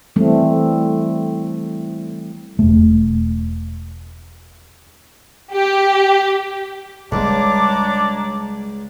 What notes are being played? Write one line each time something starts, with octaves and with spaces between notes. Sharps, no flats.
E3 G3 A3 C4
E1 A3
G4
C#2 G3 D4 C#5 A#5 D6